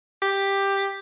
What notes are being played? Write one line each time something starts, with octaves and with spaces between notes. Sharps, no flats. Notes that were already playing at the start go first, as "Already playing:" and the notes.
G4